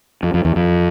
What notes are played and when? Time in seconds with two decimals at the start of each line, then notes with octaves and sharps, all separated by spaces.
0.23 F2
0.34 F2
0.45 E2
0.56 F2